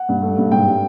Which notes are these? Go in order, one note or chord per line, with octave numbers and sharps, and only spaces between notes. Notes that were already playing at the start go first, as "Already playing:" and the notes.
Already playing: F#5
G2
A3
G2
G#2 G5
G3